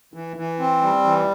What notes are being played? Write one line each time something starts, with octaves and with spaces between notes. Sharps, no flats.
E3
E3
C4
G3
E3